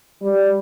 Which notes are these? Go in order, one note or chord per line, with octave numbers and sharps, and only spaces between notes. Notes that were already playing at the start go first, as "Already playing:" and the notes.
G3